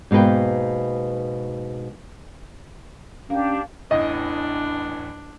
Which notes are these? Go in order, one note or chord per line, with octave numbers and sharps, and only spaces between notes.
G#2 B2 A#3 B4 G5
A#3 C#4 D4 G4
A1 E2 A2 D4 D#5